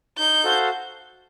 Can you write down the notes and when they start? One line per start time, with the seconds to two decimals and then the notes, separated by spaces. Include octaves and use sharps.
0.18 D#4 G6
0.44 F#4 A4 C5 F5